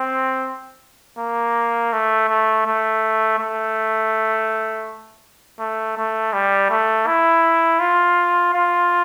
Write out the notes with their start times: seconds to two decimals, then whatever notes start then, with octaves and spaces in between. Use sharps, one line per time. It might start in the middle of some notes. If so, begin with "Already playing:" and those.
Already playing: C4
1.19 A#3
1.93 A3
2.29 A3
2.66 A3
3.39 A3
5.59 A3
5.97 A3
6.33 G3
6.70 A3
7.07 E4
7.80 F4
8.54 F4